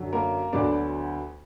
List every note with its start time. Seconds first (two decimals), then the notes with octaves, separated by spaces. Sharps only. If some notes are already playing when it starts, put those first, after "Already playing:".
Already playing: F#2 D3 F#3 C#4
0.13 A#3 A#4
0.53 D2 D3 F#3 B3 D4 D5